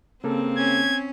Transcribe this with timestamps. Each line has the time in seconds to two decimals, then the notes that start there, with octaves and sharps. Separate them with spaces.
0.24 C#3 A#3 C4 A4
0.58 C#4 G#6